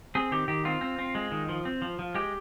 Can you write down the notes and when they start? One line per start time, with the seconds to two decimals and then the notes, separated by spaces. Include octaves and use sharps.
0.15 C4 G#4
0.32 D#3 G4
0.48 D#3 G4
0.65 C4 F4
0.81 C4
0.98 C4
1.15 G#3
1.32 D#3
1.49 F3
1.65 C4
1.82 F3
1.99 F3
2.15 G#3 G4